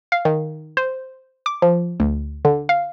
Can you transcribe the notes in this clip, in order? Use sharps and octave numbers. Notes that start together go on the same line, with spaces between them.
F5
D#3
C5
D6
F3
D2
D3
F5